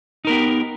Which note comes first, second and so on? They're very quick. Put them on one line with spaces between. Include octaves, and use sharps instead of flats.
D#4 A#4 B3 G4